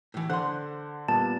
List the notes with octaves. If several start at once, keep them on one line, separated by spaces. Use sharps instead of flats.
A2 E3
D3 C5 F#5 C6
A#2 G3 B3 A5